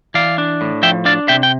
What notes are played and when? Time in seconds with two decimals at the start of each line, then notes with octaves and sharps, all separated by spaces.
0.14 E3 D5 F5
0.38 D4
0.61 A2
0.83 F3 E5 G5
1.05 D4 D5 F5
1.28 C3 E5 G5
1.43 G5